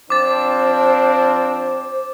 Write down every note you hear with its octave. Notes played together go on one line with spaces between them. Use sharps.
F3 C4 D4 C5 D6 A6